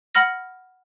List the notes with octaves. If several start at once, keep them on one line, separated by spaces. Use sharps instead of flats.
F#5 B5 F6 A#6